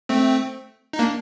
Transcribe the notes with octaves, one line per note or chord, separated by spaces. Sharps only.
A3 C4
D#4
A#3 D4